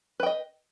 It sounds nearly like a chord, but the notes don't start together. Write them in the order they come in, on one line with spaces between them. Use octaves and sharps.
B4 G5 D#5